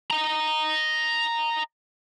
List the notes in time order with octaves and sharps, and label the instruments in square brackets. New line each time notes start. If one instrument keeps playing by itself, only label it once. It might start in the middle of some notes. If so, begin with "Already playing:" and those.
[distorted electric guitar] D#5 A#5